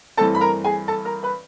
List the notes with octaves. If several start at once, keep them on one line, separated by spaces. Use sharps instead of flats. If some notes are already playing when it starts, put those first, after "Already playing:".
G2 E3 A3 C4 A4 A5
B5
A#4 A#5
G#4 G#5
A4 A5
A#4 A#5
B4 B5